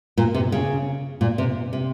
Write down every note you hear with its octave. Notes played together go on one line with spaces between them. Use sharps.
A#2
C3
C#3
A#2
C3
C3